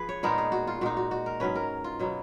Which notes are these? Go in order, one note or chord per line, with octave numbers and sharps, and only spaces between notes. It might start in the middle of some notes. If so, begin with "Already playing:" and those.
Already playing: F3 G#4 B4
C#5
A#2 G#3 B3 D#4 A#4
G#4
F#4
F4
A#2 G#3 D#4 F#4
F#4
F#4
A#4
G#2 F#3 C#4 B4
A#4
F4
B2 F#3 B3